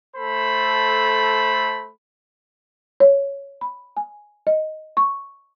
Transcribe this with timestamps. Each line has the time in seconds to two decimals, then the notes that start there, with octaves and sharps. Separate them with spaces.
0.16 A3 A4 C5 B5
3.00 C#5
3.61 B5
3.97 G#5
4.47 D#5
4.97 C#6